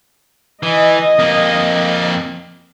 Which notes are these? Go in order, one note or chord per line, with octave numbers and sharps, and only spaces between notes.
E3 D#5
F2 A#3